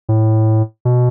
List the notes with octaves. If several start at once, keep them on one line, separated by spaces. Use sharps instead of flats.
A2
B2